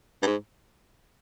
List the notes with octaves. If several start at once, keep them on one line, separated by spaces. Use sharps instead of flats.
G2
G#2